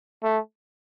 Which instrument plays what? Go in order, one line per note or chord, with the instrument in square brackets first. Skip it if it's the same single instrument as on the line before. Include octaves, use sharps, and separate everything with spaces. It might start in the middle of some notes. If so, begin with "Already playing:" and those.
[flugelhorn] A3